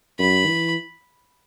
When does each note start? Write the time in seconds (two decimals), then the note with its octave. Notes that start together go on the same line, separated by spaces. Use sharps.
0.19 F#2 B5
0.47 E3